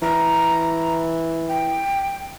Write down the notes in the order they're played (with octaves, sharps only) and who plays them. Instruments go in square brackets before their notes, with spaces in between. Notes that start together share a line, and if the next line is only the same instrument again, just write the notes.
[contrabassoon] E3 [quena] A#5
[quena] G5